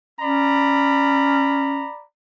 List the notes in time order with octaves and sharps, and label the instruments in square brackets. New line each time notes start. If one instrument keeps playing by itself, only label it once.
[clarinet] C#4 [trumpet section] D5 A#5 B5